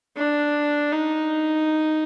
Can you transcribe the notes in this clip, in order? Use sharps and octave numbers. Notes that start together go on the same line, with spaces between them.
D4
D#4